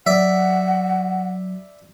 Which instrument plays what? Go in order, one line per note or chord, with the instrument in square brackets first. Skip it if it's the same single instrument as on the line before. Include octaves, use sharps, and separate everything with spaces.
[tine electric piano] F#3 [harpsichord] D5 E5 [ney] F#5